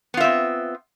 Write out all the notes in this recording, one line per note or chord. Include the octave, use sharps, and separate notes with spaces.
B3 C4 F4 E5